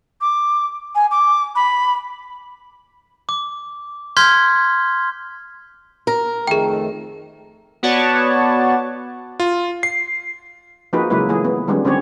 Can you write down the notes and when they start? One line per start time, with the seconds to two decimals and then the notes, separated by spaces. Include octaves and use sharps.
0.21 D6
0.95 G#5
1.11 D6
1.56 B5
3.29 D6
4.17 C6 F6 G6 G#6 B6
6.07 A#4
6.47 F2 D#3 A3 G#4 G5
7.83 B3 F#4 C#5 D5 F#5 A5
9.40 F4
9.83 C7
10.93 F3 A#3 D#4 F#4 G#4 B4
11.10 C#3 F#3 G#3 A#3 E4 B4
11.29 E3 A3 A#3 G#4
11.45 B3
11.68 D#3 F3 G3 G#3 B3 C#4
11.85 D3 C4 C#4 G4 C#5